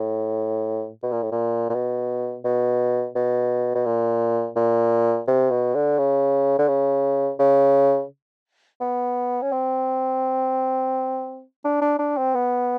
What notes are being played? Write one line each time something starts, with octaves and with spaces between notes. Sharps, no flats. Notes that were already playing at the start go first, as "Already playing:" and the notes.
Already playing: A2
B2
A#2
A2
A#2
A#2
B2
B2
B2
B2
A#2
A#2
C3
B2
D3
C#3
D3
C#3
C#3
B3
C#4
C4
D4
D4
D4
C4
B3